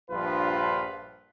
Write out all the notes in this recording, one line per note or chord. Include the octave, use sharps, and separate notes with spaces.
A#1 G2 F3 F4 B4